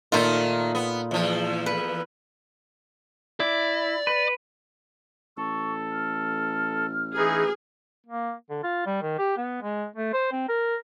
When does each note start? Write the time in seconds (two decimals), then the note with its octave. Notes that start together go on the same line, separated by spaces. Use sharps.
0.12 A#2 D#3 A3 D#4 F4
0.75 B3
1.11 E2 F3
1.66 B4
3.40 E4 D5
4.07 B4
5.37 A1 A4 C#6
5.92 F6
7.16 E3 D#4 G#4
8.06 A#3
8.50 D3
8.63 F4
8.86 G3
9.02 D#3
9.19 G4
9.37 B3
9.62 G#3
9.96 A3
10.13 C5
10.32 C4
10.49 A#4